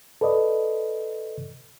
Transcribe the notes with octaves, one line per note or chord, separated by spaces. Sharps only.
A4 B4 D5 D#5